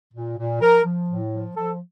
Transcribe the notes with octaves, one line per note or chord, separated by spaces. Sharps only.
A#2
A#2
F3 A#4
F3
A2
F3
F3 A4